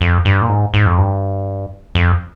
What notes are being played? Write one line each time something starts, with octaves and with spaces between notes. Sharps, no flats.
F2
G2
A#2
G#2
G#2
F2
G2
F2